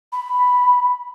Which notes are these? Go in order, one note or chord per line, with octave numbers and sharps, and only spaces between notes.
B5